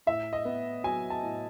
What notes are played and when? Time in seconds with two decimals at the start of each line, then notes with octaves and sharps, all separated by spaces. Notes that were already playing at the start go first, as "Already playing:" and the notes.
0.07 A2 E5
0.33 D#5
0.45 B3
0.84 F#3 G#5
1.10 A5
1.23 A2